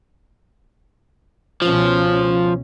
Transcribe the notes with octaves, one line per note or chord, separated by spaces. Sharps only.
C#2 B2 F3 C#4